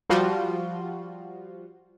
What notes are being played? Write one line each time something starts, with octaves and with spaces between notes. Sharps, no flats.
F3 G3 F4 F#4